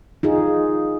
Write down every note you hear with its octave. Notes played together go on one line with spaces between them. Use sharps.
D#4 F4 G#4